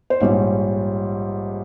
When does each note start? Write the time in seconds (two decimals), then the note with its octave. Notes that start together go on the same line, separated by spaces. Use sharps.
0.10 C5
0.20 A#1 G#2 G3 C#5